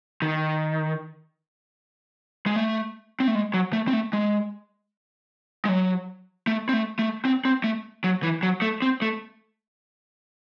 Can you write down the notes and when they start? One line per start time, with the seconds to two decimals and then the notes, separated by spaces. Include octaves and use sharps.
0.22 D#3
2.46 G#3
2.56 A3
3.20 C4
3.28 A3
3.35 G#3
3.54 F#3
3.73 A3
3.88 C4
3.93 A3
4.13 G#3
5.65 G#3
5.69 F#3
6.47 A3
6.69 C4
6.73 A3
6.99 A3
7.25 C4
7.45 C4
7.64 A3
8.04 F#3
8.23 E3
8.43 F#3
8.62 A3
8.82 C4
9.02 A3